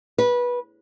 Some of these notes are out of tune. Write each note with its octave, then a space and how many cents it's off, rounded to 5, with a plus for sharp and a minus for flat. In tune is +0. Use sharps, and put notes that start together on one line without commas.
B4 -20